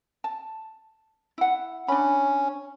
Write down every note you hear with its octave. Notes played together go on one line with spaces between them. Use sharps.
A5
E4 F#5
C#4 D4 B5